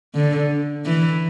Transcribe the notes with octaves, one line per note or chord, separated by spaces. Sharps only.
D3
E3